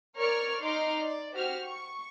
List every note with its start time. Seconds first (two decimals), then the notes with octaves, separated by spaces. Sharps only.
0.18 A#4 C#5 D5 C#6 F6
0.61 D#4 C6 D6 F6
1.00 D5
1.34 F#4 G4 C5 F6
1.66 C#6